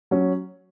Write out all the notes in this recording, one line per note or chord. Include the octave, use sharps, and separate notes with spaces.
F#3 C#4